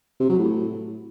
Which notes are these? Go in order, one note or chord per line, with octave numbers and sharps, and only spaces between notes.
C3
F#3
A2